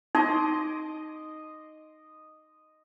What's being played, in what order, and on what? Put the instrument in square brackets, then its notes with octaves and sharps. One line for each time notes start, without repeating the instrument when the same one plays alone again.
[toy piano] D#4 [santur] D#5 C6 D6